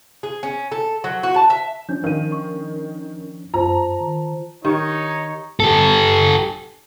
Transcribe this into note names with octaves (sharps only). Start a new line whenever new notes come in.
G#4
C#4
A4
F#3
F#4
A5
E5
F3 C#4 D4 G6
D#3 F5 D#7
C#6
F#2 F4 C5 A5 A#5
D#3
D#3 D#4 G4 C#5
G4 A4